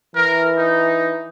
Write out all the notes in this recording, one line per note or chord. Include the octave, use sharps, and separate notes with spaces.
E3 A#4
D#4